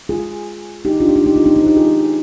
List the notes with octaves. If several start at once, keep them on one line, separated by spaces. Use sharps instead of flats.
F4 G#4
D#4 G4
D4 F4
G4
D4 F4
D#4 G4
D4 F4
C4 D#4
C4 D#4
D#4 G4
F4 G#4